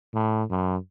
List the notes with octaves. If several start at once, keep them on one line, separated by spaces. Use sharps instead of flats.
A2
F#2